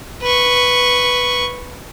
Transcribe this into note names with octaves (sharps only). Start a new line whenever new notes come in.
B4 C#6